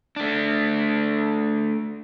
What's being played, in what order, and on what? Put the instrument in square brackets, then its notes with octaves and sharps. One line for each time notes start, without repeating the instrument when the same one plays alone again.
[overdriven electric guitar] A3 D4